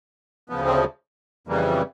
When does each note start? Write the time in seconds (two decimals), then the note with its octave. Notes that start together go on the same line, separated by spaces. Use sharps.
0.49 D2 C#3 F3 B3
0.66 C4
1.47 F2 C#3 E3 G3 A#3